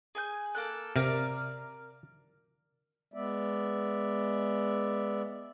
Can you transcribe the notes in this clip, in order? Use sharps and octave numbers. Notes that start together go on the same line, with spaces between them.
G#4 G#5 G6
A#3 A4 F#6
C3 A#4 D5 F5
G#3 B3 D5 E5